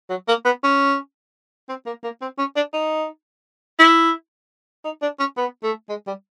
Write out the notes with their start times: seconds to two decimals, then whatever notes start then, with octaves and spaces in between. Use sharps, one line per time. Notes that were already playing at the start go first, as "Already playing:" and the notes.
0.10 F#3
0.28 A#3
0.45 B3
0.63 C#4
1.69 C4
1.86 A#3
2.04 A#3
2.22 C4
2.38 C#4
2.56 D4
2.73 D#4
3.79 E4
4.85 D#4
5.02 D4
5.19 C#4
5.37 B3
5.63 A3
5.89 G#3
6.07 G3